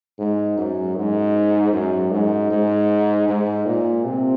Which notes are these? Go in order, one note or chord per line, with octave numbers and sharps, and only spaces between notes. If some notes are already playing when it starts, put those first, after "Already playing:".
G#2
F#2
G#2
F#2
G#2
G#2
G#2
A#2
C3